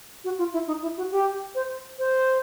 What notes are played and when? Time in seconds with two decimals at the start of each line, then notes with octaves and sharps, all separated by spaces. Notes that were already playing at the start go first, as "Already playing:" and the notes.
0.24 F#4
0.38 F4
0.53 E4
0.67 D#4
0.82 E4
0.97 F#4
1.12 G4
1.55 C5
1.99 C5